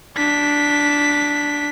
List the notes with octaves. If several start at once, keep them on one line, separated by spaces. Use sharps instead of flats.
D4 B6